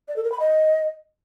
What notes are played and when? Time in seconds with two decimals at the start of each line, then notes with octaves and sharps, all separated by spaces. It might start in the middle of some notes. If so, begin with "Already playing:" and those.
0.08 D5
0.16 A4
0.24 A#4
0.32 B5
0.40 D#5